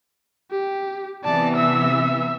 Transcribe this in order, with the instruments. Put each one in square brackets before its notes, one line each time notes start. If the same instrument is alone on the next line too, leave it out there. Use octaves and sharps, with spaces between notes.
[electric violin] G4
[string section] C3 E3 B3 [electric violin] D5 A5
[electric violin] E5 E6